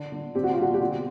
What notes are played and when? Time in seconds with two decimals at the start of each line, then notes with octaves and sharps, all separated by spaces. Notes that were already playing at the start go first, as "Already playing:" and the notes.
Already playing: D3
0.12 D3
0.35 C4 G4
0.44 F#4
0.53 F4
0.58 D3 F#4
0.74 G4
0.80 B2 F#4